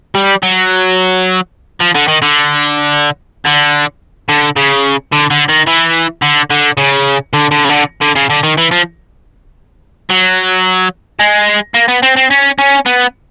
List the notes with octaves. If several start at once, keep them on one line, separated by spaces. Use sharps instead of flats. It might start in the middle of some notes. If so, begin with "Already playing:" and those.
G3
F#3
F3
D3
D#3
D3
D3
D3
C#3
D3
D3
D#3
E3
D3
D3
C#3
D3
D3
C#3
D3
D3
C#3
D3
D#3
E3
F3
F#3
G#3
A#3
B3
C4
C4
C#4
C#4
B3